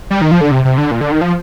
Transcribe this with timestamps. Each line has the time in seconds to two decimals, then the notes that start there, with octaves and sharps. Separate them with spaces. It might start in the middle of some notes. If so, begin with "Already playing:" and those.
0.10 G3
0.21 D#3
0.31 F3
0.41 D3
0.51 C3
0.65 C3
0.78 D3
0.91 A#2
1.01 D3
1.12 D#3
1.21 F3